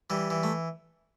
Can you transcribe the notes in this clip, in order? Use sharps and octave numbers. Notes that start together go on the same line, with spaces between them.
E3 G3
E3
A3